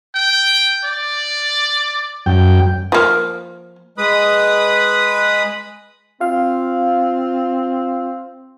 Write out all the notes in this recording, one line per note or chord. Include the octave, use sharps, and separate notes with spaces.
G5
D5
F#2 G5
F3 A#3
G#3 B4 B5 D#6
C4 F4 F5